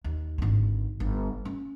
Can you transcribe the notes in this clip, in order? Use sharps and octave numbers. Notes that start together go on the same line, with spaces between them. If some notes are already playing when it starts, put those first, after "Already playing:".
D#2
G#1 D3
G1
C#4